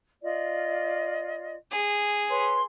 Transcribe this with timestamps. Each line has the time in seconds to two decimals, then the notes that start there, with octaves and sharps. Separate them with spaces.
0.22 F4 D5 D#5
1.72 G#4
2.29 B4 C#5 C6